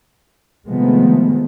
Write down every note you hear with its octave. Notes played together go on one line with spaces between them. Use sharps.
C3 D#3 F3 G#3 A3 B3